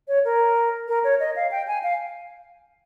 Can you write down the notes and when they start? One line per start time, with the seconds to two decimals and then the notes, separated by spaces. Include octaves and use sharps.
0.08 C#5
0.25 A#4
0.88 A#4
1.04 C#5
1.20 D#5
1.36 F5
1.51 G5
1.67 G#5
1.83 F5